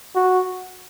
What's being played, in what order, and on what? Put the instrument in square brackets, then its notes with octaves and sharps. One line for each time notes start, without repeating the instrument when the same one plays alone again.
[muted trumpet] F#4